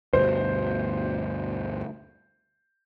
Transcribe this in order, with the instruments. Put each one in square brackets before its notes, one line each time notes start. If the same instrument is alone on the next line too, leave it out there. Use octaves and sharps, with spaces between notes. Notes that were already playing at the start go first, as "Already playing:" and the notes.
[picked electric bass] D2 G2 B2 [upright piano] C5